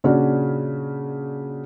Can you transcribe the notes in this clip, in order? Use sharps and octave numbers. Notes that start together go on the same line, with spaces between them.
A#2 C#3 C#4 D4 F#4